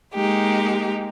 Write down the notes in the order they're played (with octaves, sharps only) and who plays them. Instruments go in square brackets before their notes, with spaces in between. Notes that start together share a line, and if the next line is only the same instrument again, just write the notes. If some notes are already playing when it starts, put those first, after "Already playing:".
[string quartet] G#3 A#3 D#4 G4